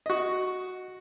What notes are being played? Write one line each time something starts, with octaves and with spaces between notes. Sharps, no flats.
F#4 D#5